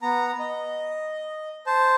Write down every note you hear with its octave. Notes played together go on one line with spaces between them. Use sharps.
B3 A#5
D#5
C5 A5